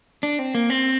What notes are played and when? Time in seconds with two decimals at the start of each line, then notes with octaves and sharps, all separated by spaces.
0.23 D4
0.39 C4
0.55 A#3
0.70 C4